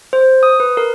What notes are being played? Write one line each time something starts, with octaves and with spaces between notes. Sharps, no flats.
C5
D#6
B4
A#4